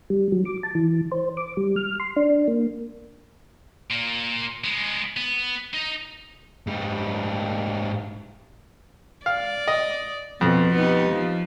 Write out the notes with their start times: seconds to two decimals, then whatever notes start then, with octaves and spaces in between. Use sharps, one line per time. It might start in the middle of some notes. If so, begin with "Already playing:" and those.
0.10 G3
0.32 F#3
0.45 D6
0.63 A5
0.75 E3
1.12 C5
1.37 D6
1.57 G3
1.76 F6
2.00 C6
2.17 D4
2.48 A#3
3.90 A#2 A#3
4.64 G#3 B3
5.16 B3
5.74 D#4 D#5
6.67 G#2 G3
9.26 D5 F5
9.68 D#5
10.41 F2 B2
10.74 B3 D#4 G4
11.12 F3